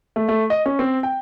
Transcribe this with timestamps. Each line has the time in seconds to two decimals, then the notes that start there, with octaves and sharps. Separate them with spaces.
0.16 A3
0.28 A3
0.50 D#5
0.66 C#4
0.79 C4
1.03 G5